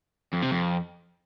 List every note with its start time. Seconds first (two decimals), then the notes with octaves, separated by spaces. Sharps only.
0.33 F2
0.42 C3
0.51 F2